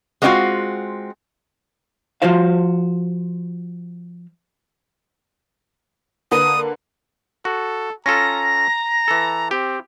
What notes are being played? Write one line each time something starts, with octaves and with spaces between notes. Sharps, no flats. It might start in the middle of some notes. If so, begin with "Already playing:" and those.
G#3 A#3 C4 C#4 F4 F#4
F3 F4 F#4 C5 F5
D3 A#3 B4 D#6
F#4 A4
C#4 F4 A4 A#5 A#6
E3 A4
C4 G4